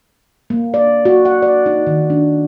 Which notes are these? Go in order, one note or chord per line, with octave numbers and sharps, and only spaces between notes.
A#3
D5
F#4
F#5
D5
D#4
D#3
D4